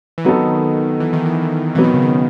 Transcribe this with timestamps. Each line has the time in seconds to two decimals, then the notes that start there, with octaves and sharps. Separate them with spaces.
0.18 E3
0.25 D#3 F#3 B3 D#4 A4
1.00 E3
1.13 D#3
1.26 E3
1.75 B2 E3 F#3 B3
1.84 D#3
1.94 C#3
2.02 D#3